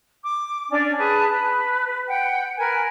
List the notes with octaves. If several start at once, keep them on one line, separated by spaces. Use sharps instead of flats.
D6
C#4 D4 D5
G#4 B4 A5
B4
F#5 G5
A#4 B4 G#5